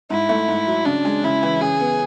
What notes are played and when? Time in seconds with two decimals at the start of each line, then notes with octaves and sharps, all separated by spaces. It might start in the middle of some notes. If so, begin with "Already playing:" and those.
0.10 G#2 E4
0.29 A3
0.48 G#2
0.67 F#3
0.85 C#3 D4
1.05 G#3
1.24 C#3 E4
1.43 E3
1.61 C#3 G#4
1.80 B3